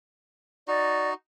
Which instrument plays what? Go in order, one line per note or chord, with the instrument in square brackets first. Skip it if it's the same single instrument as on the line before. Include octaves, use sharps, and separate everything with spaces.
[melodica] D#4 F#4 [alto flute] D5